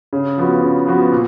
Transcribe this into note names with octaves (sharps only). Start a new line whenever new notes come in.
C#3
F3 B3 F#4
C#3
F3 B3 F#4
A#2